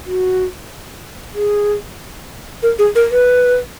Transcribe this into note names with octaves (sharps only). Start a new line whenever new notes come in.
F#4
G#4
A#4
G#4
A#4
B4